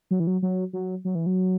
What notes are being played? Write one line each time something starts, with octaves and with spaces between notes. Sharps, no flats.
F#3
E3
F#3
F#3
F#3
F#3
E3
F#3